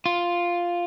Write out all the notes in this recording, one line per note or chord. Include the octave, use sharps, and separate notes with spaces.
F4